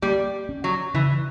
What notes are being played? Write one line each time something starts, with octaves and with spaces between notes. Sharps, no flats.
G3 A#3
C#4
F#3
C#3 E3